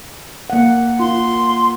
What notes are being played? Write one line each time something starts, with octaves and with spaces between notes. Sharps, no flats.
A#3 F#5
F4 C6